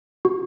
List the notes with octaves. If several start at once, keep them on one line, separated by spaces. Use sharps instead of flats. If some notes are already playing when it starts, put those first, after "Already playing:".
F#4